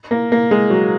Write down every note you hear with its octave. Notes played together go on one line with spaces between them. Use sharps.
A#3
A#3
G#3
F#3